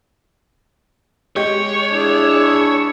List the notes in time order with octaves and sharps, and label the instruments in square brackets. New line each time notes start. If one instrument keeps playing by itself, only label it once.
[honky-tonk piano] G#3 G4 [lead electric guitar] C#5
[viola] D4 E4 [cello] G#4